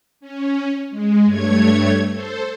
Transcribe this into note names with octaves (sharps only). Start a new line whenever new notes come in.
C#4
G#3
G2 A3 C#5 G#6
A4 C5